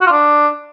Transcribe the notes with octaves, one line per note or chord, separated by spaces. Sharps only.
F#4
F4
D4